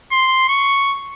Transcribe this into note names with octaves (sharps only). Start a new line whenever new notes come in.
C6
C#6